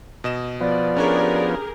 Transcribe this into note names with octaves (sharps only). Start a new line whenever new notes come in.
B2 D#5 E7
F3 B3 D5
C#4 D4 G4 G#4 A#4 C#5